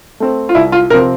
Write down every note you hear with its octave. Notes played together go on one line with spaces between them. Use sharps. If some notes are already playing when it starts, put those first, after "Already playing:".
A3 C4
F4
C2 E4
F4
C3 F3 C4 A#4